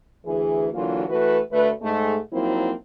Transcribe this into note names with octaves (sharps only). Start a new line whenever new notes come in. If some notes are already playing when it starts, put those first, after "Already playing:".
D2 E3 G#4
D3 E3 F#3 A#3 F4
E3 A3 F#4 B4
D2 A3 B4
G#2 G#3 A3
F3 F#3 A#3 C4 D#4 E4